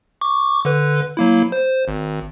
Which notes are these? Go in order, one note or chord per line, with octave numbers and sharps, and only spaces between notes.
C#6 D6
D3 B4
F#3 A#3 E4
C5
G#1